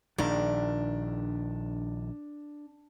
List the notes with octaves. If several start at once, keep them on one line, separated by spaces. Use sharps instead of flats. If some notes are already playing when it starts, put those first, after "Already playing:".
A#1 D#3 D4